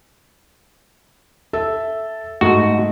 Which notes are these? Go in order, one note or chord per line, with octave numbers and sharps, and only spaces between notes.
A4 E5
G#2 A3 F#4